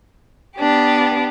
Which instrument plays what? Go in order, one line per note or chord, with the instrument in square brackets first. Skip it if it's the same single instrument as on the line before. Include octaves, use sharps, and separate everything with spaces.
[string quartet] B3 D4 G4